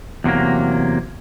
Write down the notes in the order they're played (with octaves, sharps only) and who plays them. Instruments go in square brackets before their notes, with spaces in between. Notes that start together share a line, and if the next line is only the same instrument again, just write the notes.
[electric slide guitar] E2 C3 F#3 A#3